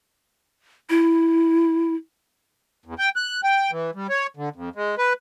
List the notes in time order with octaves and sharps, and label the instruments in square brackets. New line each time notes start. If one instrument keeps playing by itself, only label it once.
[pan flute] E4
[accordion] E2
G5
F#6
G5
E3
G3
C#5
D3
F2
G#3
B4